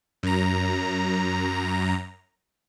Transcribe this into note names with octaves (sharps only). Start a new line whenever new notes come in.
F#2 A#5